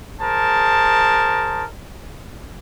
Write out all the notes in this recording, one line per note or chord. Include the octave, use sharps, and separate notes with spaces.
G#4 A#4 C5 A5